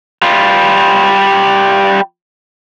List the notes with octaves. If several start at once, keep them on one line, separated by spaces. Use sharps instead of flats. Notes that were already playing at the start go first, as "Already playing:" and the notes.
G3 F4